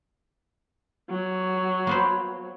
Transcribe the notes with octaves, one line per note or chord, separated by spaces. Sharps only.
F#3
A#3 B3 C5